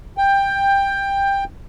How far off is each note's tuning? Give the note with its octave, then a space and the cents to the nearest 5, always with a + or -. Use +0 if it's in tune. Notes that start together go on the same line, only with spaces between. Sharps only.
G5 +15